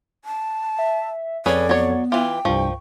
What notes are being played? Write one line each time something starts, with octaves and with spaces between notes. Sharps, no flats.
A5
E5
F2 C#4 G#4 A4 B4 D5 G#6
F#3 B3 C#5
E3 F4 G5 D6
C2 G2 F3 C#6